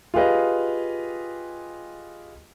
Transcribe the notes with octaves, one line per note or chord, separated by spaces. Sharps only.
F4 G4 G#4 B4 D#5 F5